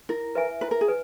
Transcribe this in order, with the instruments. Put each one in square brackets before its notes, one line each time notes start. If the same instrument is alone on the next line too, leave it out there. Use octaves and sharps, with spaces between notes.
[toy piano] E4 [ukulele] A#4
[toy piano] B4 E5 G#5
[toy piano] E4 [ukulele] B4
[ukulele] A#4
G#4
[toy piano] B4 G#5